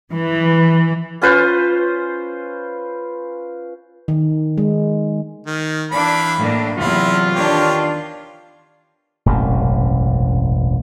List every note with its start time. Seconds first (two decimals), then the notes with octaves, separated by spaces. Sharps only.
0.11 E3
1.22 C#4 F4 B4 C5
4.08 D#3
4.58 G#3
5.46 D#3
5.91 E3 D4 F5 B5
6.38 A2 A#3 D4
6.78 E2 C3 F#3 B3 E4 F4
7.34 D#3 D4 G4 C#5
9.26 E1 A1 F#2 C3